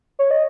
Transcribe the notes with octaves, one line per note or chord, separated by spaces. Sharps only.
C#5
D#5